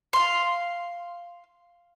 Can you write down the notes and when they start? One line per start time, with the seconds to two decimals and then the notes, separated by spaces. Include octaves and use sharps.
0.13 F5 C6